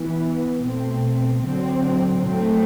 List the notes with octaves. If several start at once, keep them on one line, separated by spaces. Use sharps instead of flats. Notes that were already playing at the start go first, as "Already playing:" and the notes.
Already playing: E3 B3
B2 A3 C4
D3 F#3 C4
A2 F#3 A3 C4